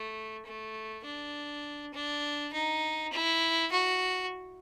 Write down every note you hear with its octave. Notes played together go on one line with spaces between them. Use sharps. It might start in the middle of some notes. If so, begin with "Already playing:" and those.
Already playing: A3
A3
D4
D4
D#4
E4
F#4